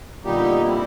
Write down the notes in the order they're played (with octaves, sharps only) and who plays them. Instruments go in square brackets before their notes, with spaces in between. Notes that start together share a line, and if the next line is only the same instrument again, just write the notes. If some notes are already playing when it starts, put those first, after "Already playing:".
[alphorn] A#2 [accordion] D3 G3 B3 D#4 G4
[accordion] D3 G3 C4 E4